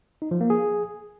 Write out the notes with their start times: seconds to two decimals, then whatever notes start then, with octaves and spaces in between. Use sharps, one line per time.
0.22 D#4
0.31 F3
0.41 A#3
0.50 G#4